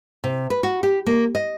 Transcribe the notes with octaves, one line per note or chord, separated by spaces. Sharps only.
C3
B4
F#4
G4
A#3
D#5